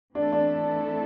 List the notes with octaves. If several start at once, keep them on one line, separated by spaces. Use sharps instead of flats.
E3 A3 C4 D4 E4 A4
D4